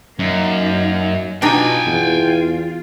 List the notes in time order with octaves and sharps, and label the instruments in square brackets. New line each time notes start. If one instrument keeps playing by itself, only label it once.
[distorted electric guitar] F#2 [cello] A#3 D#4
[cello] B2 F4 [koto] D4 D#4 [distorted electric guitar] G5 G#5
[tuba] E2 [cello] F4